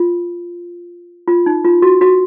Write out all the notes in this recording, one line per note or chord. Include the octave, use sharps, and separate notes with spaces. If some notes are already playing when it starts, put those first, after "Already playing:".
Already playing: F4
F4
D#4
F4
F#4
F#4